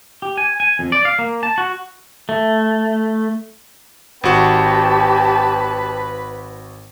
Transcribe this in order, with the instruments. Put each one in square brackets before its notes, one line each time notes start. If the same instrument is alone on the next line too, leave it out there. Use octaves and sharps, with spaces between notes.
[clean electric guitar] G4
G#5
G#5
F2
D5
F5
A#3
A5
F#4
[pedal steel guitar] A3
[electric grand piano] G#1 F#4 [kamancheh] G4 A5 [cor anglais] B4